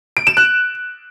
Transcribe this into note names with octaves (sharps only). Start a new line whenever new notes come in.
D7
E7
F#6